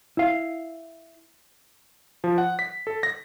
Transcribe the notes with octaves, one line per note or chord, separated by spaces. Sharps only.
E4 F5
F3
F#5
B6
A4
A#6